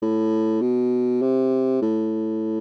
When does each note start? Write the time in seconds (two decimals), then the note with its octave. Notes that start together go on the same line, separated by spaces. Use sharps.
0.02 A2
0.61 B2
1.22 C3
1.82 A2